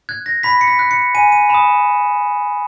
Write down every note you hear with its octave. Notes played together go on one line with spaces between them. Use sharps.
F#6 G#6
A#6
B5 B6
C#7
B6
F#6
C#7
G#5 D#7
D#7
B5 D#6 E7